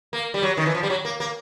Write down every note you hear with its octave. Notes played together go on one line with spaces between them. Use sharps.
A#3
G3
F#3
D#3
E3
F3
G3
F#3
A#3
A#3